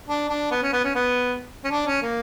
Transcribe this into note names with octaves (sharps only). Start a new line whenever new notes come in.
D4
D4
B3
C#4
B3
C#4
B3
C#4
D4
C#4
A#3